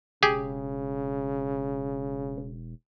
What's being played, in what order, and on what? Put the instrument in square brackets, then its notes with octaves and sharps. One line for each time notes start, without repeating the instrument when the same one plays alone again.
[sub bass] E1 [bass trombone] C#3 [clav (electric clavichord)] G4 G#4